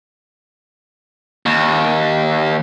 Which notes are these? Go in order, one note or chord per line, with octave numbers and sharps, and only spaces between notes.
D#2